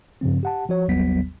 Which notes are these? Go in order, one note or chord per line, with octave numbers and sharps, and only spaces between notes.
G2 C#3 F3 C4
G4 F#5 A5
F3 F#4 C#5
G#1 D#2 F#3 G3 B3 B6